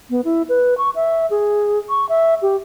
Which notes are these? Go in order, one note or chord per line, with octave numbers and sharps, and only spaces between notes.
B3
E4
B4
C#6
E5
G#4
C#6
E5
G4